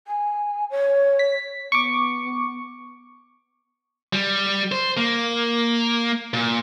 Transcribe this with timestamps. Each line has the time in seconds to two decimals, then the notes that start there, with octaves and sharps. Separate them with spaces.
0.07 G#5
0.71 C#5
1.19 B6
1.72 B3 C#6 D6
4.13 G3
4.72 C5
4.97 A#3
6.34 A#2